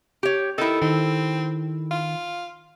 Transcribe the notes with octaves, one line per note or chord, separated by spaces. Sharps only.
G4 C#5
D#3 E4 A4
D#3 C4
F4